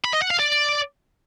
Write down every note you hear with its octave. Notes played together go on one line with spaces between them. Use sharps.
B5
D#5
F#5
F5
D5